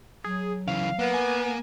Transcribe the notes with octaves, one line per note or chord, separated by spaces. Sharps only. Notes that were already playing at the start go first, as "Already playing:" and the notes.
F#3 G#4
C#3 E3 F5
A#3 B3
G#5